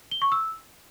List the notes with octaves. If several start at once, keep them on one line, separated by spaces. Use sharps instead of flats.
G7
C#6
E6